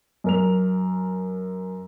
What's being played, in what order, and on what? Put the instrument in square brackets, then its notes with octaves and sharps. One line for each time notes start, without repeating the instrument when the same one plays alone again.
[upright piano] F#2 A#4 F7